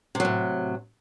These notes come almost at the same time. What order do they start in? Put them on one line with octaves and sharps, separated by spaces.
C3 F#3 A2